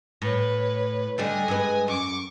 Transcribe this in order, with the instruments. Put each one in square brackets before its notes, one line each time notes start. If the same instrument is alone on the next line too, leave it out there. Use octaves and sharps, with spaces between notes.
[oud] A2 [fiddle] B4 C#5
[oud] D3 G3 A3 [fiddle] D#5 G#5
[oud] G2 G#3 B4
[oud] F#2 [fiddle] C#6 D6